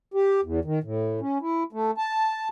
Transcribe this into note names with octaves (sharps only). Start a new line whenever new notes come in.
G4
E2
D#3
A2
C#4
E4
A3
A5